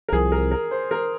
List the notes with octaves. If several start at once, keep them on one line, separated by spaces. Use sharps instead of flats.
A#4
C2 C3 F3 G#4
A#4
A#4
C5
A#4